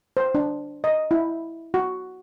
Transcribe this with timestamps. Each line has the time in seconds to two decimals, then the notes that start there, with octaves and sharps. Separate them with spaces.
0.17 C5
0.35 D4
0.84 D#5
1.11 E4
1.74 F#4